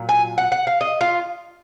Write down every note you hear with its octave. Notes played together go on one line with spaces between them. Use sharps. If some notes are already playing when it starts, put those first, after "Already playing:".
Already playing: A#2 F#3
G#5
F#5
F#5
F5
D#5
F4